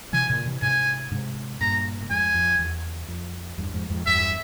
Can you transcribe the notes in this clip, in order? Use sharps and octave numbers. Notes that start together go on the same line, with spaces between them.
C3 E3 G#5
A#2 C#3
C3 E3
G#2 C3 G#5
G#2 C3
G2 A#2 A#5
A#2
F2 G#2 G#5
F2
E2
F2
E2 G2
F2 G#2
F2 G#2
E2 G2 E5